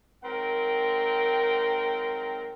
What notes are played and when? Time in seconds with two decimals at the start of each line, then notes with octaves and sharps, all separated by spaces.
0.24 G#2 F#3 C4 A#4 G5